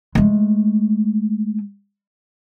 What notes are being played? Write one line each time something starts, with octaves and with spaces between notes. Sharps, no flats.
G#3 A3